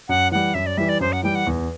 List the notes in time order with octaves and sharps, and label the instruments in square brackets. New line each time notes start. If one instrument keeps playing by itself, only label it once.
[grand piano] F#2 [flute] F#5
[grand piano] E3 G3 [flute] F#5
[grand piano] F#2 [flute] E5
[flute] D5
[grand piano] E3 G3 [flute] E5
[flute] D5
[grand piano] F#2 [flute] C5
[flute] F#5
[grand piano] E3 G3 [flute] G5
[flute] F#5
[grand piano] E2